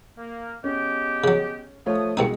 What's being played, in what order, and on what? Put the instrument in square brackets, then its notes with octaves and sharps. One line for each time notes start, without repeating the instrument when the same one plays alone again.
[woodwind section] A#3
[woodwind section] G#3 B3 G4 [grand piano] C#4
[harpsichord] C#3 F#3
[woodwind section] F3 D#6 [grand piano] A3 F4 C#5
[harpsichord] C2 C4 D#4 [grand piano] B2 G#3 C#7